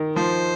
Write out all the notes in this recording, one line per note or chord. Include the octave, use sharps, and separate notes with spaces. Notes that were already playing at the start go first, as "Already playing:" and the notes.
Already playing: D#3
F3 C5